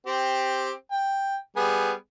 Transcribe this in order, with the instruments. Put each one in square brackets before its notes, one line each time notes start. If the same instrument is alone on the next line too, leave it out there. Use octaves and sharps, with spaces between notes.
[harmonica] C4 G4
G5
G3 B3 G#4